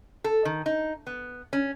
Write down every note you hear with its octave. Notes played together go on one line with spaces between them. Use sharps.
A4
D#3
D#4
B3
C#4